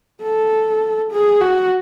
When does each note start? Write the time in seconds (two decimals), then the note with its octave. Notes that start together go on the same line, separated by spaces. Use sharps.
0.22 A4
1.11 G#4
1.40 F#4